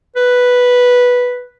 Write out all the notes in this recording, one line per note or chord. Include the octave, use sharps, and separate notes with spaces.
B4